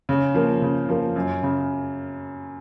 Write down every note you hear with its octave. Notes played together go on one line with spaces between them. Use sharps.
C#3
F3 A#3
C#3
F3 A#3
F#2
C#3